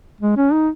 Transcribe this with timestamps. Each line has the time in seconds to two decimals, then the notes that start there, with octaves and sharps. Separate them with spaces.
0.21 G#3
0.37 C#4
0.53 D#4